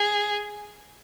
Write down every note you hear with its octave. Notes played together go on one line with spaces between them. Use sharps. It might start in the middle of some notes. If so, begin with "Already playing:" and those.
Already playing: G#4